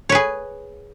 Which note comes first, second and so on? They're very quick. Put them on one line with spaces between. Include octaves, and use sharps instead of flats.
C#5 B4 G#4